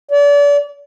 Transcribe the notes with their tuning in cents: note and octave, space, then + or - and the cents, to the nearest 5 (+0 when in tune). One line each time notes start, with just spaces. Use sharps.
D5 -35